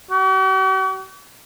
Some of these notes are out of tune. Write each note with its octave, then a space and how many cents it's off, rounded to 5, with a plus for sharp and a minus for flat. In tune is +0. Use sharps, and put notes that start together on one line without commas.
F#4 +45